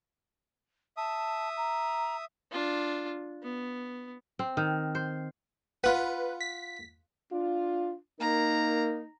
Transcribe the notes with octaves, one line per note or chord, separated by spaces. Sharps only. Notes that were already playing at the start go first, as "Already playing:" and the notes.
E5 A5 D#6
A#5
D4 F4
B3
C4
D#3
C5
F4 B4 F#5
B6
D4 F4
A#3 D#4 A#4 A#5